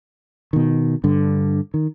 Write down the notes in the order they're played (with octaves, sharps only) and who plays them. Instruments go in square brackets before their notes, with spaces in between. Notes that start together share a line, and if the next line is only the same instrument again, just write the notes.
[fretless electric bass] B2 D#3
G2 D3
D#3